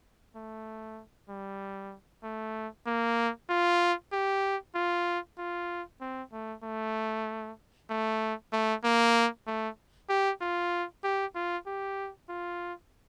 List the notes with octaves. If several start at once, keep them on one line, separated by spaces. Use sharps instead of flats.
A3
G3
A3
A#3
F4
G4
F4
F4
C4
A3
A3
A3
A3
A#3
A3
G4
F4
G4
F4
G4
F4